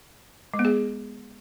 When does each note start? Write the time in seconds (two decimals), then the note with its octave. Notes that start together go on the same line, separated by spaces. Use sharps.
0.54 G#3
0.59 B3
0.65 G#4